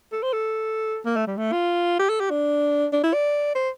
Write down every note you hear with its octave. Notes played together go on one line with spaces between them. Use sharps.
A4
C5
A4
A#3
A3
G3
A3
F4
G4
A4
G4
D4
D4
E4
D5
C5